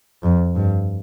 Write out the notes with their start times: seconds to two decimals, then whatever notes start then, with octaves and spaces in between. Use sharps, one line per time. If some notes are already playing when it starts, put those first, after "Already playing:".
0.23 F2
0.56 G2